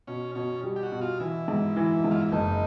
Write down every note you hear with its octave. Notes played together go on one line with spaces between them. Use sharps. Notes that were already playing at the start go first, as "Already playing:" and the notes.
B2 C#4
B2 C#4
G3
G4
F#4
B2
F4
E3 E4
G#2
E3
G#2
F4
E4
F#1 D#4